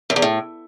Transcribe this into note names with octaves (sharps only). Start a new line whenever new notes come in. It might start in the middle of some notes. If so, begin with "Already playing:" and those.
F#2
E2
A2